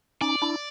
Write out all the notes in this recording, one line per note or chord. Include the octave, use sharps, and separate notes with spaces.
C#4 D#4 D5
D4 E4